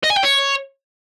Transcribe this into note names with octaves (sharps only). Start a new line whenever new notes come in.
D#5
G#5
G5
C#5